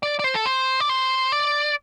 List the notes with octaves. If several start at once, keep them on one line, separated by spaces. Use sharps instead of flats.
D5
D5
C5
A4
C5
D5
C5
D5